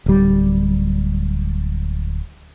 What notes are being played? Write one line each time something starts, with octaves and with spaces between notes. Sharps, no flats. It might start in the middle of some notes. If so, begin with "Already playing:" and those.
D1 G3